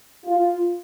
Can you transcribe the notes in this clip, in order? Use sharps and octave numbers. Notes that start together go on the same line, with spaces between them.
F4